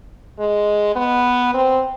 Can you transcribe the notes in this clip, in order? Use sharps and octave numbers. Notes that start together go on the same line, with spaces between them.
G#3
B3
C4